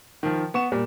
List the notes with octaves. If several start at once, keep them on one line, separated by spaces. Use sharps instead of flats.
D#3 F3
B3 C#6 E7
A#2 G3